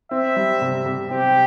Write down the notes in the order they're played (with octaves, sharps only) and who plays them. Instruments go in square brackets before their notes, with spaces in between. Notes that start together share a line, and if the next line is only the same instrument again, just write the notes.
[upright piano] C4 [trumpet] E5
[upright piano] G3
C3
C3
[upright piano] C4 [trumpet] G4